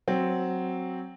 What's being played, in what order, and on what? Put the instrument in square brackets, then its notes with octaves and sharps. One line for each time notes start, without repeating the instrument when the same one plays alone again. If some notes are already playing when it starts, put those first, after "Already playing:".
[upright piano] F#3 C4